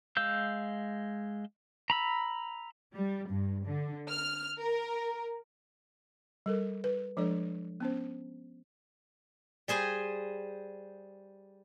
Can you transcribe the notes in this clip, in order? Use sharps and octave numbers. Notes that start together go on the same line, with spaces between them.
G#3 F5 E6 G6
A#5 B5 E6
G3
G2
D3
F6
A#4
G3 A4 A#4
B4
F3 G#3 D4 A4 D5
B3 C#4 C5
G3 G#4 C5 G#5